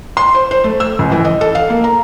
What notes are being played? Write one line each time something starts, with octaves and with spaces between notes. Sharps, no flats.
C6
C5
C5
A3
E6
C#2
E3
D#5
A4
F5
A#3
A#5